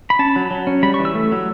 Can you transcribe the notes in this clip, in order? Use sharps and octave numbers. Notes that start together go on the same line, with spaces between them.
B5
C#4 A5
F#3
F#3
C#4
G3 B5
C#6
E3
E6
A3
F#3